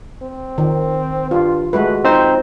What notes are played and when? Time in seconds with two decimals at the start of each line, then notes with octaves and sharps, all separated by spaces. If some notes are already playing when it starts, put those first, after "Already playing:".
0.22 C4
0.58 D#3
1.31 G2 F4
1.73 G#3 A3 F#4 B4
2.04 F3 C4 D#4 C5